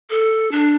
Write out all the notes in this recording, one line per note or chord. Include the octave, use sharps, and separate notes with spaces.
A4
D4